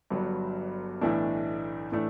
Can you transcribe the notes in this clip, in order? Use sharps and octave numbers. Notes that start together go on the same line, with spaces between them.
G1 G2 F#3
B1 A2 E3 A3 D4
A2 E3 A3 D4